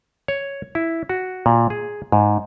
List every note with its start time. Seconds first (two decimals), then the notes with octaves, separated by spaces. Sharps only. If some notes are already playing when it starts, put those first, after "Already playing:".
0.28 C#5
0.75 E4
1.09 F#4
1.46 A#2
1.70 G#4
2.12 G#2